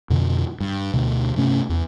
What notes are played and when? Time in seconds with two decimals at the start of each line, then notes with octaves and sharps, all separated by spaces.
0.10 F2 B2 D3
0.60 G2
0.94 D2 B2
1.36 G2 C3 A3 C#4
1.69 E2